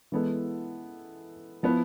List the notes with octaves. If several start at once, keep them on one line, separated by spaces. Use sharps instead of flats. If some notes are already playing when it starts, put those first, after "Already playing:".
E3 G#3 B3 E4 A4
F3 B3 E4 B4